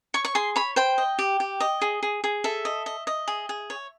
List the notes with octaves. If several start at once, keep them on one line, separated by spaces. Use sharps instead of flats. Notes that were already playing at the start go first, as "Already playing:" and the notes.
C#5 C#6
C#6
G#4 C6
C#5 B5
C5 G5
D#5
G4
G4
D#5
G#4
G#4
G#4
A4 E5
D#5
D#5
D#5
G#4
G#4
C#5